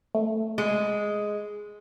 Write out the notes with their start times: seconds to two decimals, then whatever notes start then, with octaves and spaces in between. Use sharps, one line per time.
0.15 A3
0.58 G#3